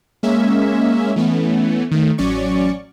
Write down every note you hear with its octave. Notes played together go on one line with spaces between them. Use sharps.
G#3 A#3 C#4 E5
E3 A3 B3 C#4
D#3 A3
A1 F#3 C#4 D5 C#6